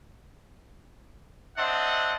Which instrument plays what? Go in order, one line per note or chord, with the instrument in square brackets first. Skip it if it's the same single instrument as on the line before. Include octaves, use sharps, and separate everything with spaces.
[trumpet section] C4 D4 D#5 E5 F#5